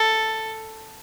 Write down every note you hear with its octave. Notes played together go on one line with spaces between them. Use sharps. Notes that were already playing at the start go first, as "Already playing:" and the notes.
Already playing: A4